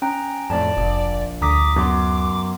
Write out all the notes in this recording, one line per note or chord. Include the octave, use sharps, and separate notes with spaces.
C#4 G5 A#5
F2 A2 D5 A5
F1 A#1
D2 A#5 D6 D#6 B6
F#2 B3 C6 D6